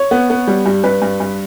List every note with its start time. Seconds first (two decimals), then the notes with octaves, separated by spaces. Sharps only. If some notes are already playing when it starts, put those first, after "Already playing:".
Already playing: C#5
0.11 B3
0.30 B3
0.47 G3
0.66 G2
0.84 G2 B4
1.02 G2
1.20 G2